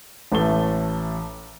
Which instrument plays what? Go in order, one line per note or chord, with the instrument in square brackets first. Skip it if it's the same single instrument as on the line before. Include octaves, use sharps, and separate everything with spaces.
[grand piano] A1 A2 A3 A4 G7